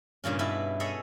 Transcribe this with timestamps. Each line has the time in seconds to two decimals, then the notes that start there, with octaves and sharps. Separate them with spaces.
0.24 G2 A#2 C#3 C#4
0.39 G2 B2 E4 B4 A5
0.80 G#4 A4 C#5 D#5 E5